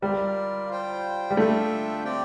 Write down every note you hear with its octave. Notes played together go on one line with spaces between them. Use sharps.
G3 F4 A#4 D5
F4 C5 G5
G3
A3 D4 F4 A4 E5 G5
C4 G4 D5 G5